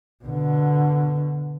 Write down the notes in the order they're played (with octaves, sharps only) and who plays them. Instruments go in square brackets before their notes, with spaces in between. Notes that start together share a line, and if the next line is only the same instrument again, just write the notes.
[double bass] B2 D3